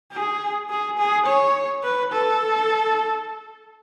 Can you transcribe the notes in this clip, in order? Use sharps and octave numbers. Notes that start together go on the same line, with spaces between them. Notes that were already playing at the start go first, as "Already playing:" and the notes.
G#4
G#4
G#4
C#5
B4
A4